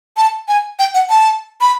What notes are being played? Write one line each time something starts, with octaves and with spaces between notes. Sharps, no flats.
A5
G#5
G5
F#5
A5
B5